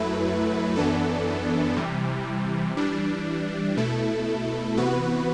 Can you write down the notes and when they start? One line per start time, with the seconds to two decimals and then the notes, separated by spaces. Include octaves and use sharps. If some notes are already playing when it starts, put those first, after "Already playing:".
Already playing: F#2 F#3 A3 E4 B4
0.76 F#2 E3 B3 D4 A4
1.76 C3 E3 G3
2.77 E3 G3 D4
3.77 B2 A3 E4 A4
4.77 C3 E3 B3 F#4 B4